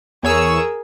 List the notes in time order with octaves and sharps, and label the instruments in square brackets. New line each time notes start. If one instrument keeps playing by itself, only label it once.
[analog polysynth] E2 C#5 E6 [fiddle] G#4 A#4